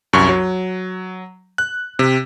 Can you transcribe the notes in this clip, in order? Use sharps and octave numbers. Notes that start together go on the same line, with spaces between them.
C2 F#2 C#6
F#3
F#6
C3